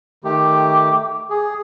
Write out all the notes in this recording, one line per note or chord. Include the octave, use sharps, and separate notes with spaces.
D#3 A3 G4 D6
G#4